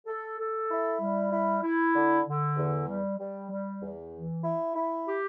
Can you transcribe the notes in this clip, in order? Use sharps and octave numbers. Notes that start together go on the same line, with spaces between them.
A4
A4
E4
G3
E4
E4
D3
D3
E2
G3
G3
G3
E2
E3
E4
E4
G4